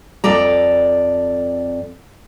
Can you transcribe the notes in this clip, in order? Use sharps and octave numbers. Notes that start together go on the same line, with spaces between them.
F2 A4 D5 A#5